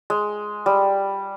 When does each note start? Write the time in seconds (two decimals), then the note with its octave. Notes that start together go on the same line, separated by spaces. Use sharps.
0.10 G#3
0.66 G3